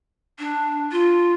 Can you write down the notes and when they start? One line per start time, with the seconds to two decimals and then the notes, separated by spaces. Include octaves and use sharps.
0.39 D4
0.92 F4